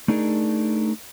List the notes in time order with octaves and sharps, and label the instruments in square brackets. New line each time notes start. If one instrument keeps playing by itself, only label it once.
[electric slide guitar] A3 D4 D#4 G#4 A#4